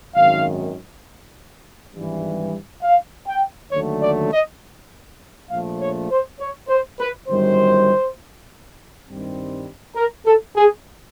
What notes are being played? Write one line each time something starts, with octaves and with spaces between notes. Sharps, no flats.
G#1 F#2 D#3 F5
G#1 G2 E3 G3
F5
G5
D#2 D3 F#3 A3 C#5
D5
D#5
A#1 A#2 F3 A3 F5
C#5
C5
C#5
C5
B4
G1 F#2 D#3 G3 C5
G2 D#3 G3 C4
A#4
A4
G#4